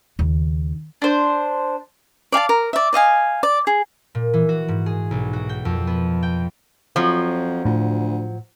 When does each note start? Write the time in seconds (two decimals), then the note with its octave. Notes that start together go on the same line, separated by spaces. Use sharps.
0.19 D#2 C#3
1.02 D4 C5
2.32 D5 F5 G#5 A5
2.49 A#4
2.73 D5 E5
2.93 D5 D#5 F5 G#5
3.43 D5
3.67 G#4
4.15 A#2
4.33 E3
4.49 F#4
4.68 G#2
4.86 G#4
5.11 B1
5.33 F#4
5.49 G5
5.65 F2
5.87 B3
6.23 G5
6.96 F2 F3 F#3
7.65 D2 A2